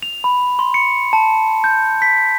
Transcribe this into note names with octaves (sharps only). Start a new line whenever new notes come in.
F7
B5
C6
C#7
A5
G6
B6